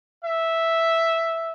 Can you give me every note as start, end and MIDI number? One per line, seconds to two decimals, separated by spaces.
0.24 1.53 76